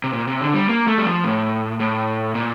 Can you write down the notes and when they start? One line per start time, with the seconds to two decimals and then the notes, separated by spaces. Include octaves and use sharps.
0.04 C3
0.13 A#2
0.28 C3
0.41 D3
0.54 G3
0.69 A#3
0.87 A3
0.98 G3
1.06 F3
1.24 A2
1.80 A2
2.35 A#2